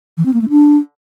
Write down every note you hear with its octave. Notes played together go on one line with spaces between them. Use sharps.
E3
C4
A#3
A3
D4